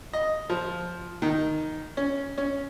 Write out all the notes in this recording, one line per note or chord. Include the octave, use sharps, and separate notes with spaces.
D#5
F3
D#3
C#4
C#4